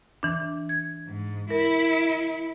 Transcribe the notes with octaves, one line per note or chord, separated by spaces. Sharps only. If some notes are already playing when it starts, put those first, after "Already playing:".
E3 D4
G#6
G#2
E4 A#4